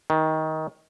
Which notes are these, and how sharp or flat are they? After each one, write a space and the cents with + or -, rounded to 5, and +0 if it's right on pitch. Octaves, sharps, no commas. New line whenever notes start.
D#3 +20